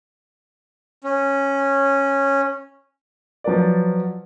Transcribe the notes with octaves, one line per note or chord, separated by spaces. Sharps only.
C#4
F3 F#3 B4 D5